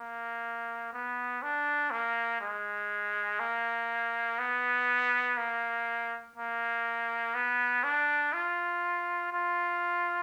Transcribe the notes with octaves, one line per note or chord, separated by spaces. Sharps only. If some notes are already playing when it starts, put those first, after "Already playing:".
Already playing: A#3
B3
D4
A#3
G#3
A#3
B3
A#3
A#3
B3
D4
F4
F4